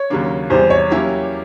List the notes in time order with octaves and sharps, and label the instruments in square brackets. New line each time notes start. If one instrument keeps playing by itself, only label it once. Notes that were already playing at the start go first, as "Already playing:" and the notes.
Already playing: [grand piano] C#5
[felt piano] D#2 C#3 F#3 A#3 D4
[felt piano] E2 C3 E3 G3 [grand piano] C5
[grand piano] C#5
[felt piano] F#3 A#3 C#4 E4 G4